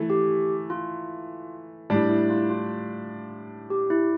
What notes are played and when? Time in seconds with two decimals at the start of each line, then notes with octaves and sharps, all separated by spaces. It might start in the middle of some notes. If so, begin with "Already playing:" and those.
Already playing: E3 A3
0.10 G4
0.70 F4
1.90 A2 G3 D4 E4
2.09 E4
2.30 F4
2.50 F4
3.70 G4
3.90 E4